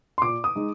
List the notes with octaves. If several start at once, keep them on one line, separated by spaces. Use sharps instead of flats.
C6
A#2 D6
D#6
G#3 D#4